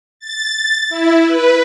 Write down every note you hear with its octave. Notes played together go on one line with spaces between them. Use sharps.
A6
E4
B4